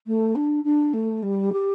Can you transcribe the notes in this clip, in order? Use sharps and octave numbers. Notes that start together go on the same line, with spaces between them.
A3
D4
D4
A3
G3
G4